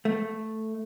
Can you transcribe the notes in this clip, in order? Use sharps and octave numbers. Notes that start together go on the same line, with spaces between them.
A3